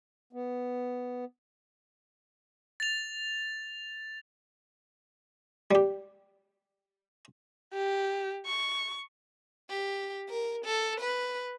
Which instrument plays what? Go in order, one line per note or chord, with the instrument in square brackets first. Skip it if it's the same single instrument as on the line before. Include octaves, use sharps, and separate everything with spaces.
[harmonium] B3
[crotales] A6 F7
[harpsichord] G3 G4
[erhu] G4
C#6
[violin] G4
A#4
A4
B4